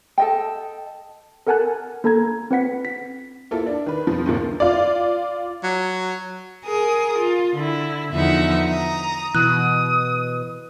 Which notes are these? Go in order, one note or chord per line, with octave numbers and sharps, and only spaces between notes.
A4 D#5 G5
A4 A#4 F#5 G#5 A5 F#6
A#3 A4 A5 A#5 G#6
C4 B4 F#5 B6
B6
A#3 E4 F4 A4
D4
D#3 B4
G2 C3 F3
C#2 F#2 A2 D3 F3 A#3
F4 D5
F#3
G#4 A#4 D#6
F4
D3 E4
E2 D3 F3 D#4 E5 F#5
A#5 D#6
B2 E3 D#6 F#6